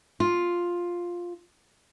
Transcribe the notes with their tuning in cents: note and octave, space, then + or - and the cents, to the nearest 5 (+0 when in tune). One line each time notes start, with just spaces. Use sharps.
F4 +5